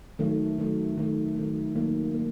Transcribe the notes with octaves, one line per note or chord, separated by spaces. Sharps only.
D#3 F#3 A3
D#3 F#3 A3
D#3 F#3 A3
D#3 F#3 A3
D#3 F#3 A#3
A#3